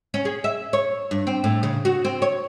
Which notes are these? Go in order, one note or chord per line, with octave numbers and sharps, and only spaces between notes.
C#4
G#4
E5
C#5
G2
C4
A2
C#3
F#4
C4
C#5